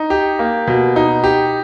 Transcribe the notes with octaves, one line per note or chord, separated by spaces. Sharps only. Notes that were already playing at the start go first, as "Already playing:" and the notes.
Already playing: D#4
G4
A#3
B2
D#4
G4